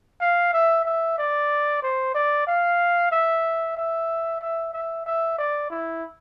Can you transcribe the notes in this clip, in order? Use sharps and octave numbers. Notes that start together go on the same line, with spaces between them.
F5
E5
E5
D5
C5
D5
F5
E5
E5
E5
E5
E5
D5
E4